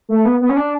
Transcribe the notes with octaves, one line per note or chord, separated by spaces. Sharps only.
A3
B3
B3
C#4
D4